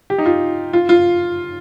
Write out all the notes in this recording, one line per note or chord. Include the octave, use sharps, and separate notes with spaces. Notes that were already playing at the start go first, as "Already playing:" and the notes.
G4
D#4
F4
F4
F4